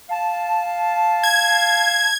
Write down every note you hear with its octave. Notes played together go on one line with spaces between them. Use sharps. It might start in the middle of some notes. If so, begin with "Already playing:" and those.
F5 A5
G#6